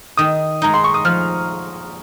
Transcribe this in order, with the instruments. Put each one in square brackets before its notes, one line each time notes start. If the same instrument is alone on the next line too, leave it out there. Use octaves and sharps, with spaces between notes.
[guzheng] D#3 [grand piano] D#6
[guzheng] G#3 D#4 [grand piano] A#5
[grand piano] C6
C#6
D#6
[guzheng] F3 [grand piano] F6